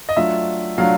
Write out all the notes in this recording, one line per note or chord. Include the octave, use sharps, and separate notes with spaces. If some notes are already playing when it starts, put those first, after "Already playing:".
D#5
F#3 A3 D4 F4 E5
F#3 A3 D4 F4 F5